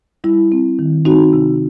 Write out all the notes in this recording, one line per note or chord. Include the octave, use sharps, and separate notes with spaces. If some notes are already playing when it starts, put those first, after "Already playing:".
G3 E4
C4
D#3
C4 D#4 F#4
C3